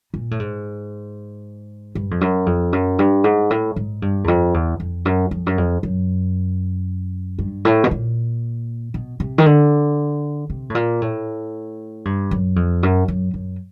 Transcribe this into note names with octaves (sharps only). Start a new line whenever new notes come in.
A#2
A2
G#2
G2
F2
F#2
F2
F#2
G2
G#2
A2
G#2
G2
E2
F2
E2
F2
F#2
F2
F#2
F2
F#2
G2
A2
B2
A#2
B2
C3
D#3
D3
C3
A2
A#2
A2
G2
F#2
F2
F#2
F#2
F#2